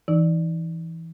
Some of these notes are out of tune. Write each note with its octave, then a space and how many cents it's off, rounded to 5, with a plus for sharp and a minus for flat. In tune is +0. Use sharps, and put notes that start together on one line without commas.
E3 +0 D#4 +0